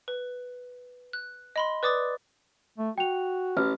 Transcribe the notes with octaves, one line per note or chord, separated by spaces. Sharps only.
B4
F#6
D#5 B5 C6
B4 D5 D6 D#6 A6
A3
F#4 G5 F7
A1 F6